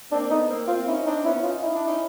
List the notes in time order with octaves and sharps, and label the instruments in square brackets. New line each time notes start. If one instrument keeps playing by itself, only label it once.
[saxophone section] A#3 C4 [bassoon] D4
[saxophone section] A3 B3 [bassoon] D#4
[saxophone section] A#3 C4
[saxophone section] A#3 C4 [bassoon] F4
[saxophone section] C#4 D#4 [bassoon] E4
[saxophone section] C4 D4 [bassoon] D#4
[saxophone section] B3 C#4 [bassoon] E4
[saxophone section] C#4 D#4 [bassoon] F4
[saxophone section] D#4 [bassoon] E4
[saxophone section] D4
C#4 D#4